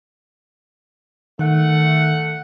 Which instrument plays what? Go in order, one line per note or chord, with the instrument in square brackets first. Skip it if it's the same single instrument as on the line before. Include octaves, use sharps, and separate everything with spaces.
[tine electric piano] D#3 [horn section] A3 F#5